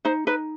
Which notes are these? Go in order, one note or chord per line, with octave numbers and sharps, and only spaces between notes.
D#4 C5
D#4 B4